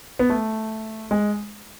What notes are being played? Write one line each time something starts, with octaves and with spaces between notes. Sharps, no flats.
B3
A3
G#3